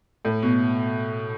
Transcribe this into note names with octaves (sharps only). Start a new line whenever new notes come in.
A2
B2